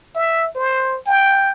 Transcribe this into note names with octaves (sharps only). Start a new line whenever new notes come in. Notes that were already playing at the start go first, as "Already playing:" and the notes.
E5
C5
G5